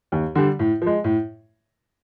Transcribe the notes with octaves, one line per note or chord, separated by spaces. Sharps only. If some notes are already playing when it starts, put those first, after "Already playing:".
D#2
D3 G3
A2
F3 G#3
A2